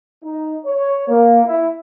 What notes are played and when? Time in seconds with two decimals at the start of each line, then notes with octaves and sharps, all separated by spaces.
0.24 D#4
0.66 C#5
1.09 A#3
1.46 E4